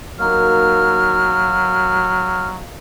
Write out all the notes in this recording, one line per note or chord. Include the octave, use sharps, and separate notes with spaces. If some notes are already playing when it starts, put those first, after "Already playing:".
F#3 A#3 D#4 F#4 F6